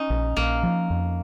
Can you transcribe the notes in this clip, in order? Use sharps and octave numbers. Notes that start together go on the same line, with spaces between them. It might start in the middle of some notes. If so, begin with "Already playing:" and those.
Already playing: C#4 D#4
A#1
A#1 A#3
F3
F2